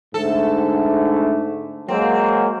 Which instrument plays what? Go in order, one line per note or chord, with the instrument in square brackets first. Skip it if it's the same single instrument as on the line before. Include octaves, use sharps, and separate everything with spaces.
[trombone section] G#2 D3 A3 [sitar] A4
[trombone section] F#3 G#3 A#3 [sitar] C4